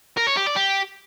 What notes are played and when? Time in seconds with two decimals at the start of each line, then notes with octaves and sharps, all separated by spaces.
0.18 A#4
0.27 C#5
0.37 G4
0.46 D5
0.56 G4